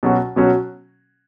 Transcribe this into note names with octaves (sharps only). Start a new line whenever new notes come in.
B2 F#3 C#4 F#4
B2 F#3 C#4 F#4